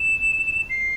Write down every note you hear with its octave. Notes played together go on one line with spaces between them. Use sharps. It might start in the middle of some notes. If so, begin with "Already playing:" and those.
Already playing: E7
C7